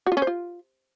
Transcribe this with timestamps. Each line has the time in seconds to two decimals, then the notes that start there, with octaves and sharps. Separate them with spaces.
0.06 F#4
0.12 F4
0.17 C#4
0.22 C5
0.27 F4